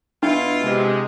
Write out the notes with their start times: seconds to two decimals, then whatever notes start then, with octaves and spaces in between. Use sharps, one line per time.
0.23 B2 D4 E4 F4
0.63 C3 G#3